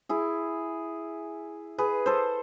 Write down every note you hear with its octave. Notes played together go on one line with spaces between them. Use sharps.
E4 G#4
G#4 B4
A4 C5